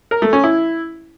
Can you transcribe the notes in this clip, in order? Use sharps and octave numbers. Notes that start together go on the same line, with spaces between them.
A#4
A3
C#4
E4